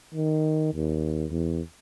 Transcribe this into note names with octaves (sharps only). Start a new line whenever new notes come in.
D#3
D#2
E2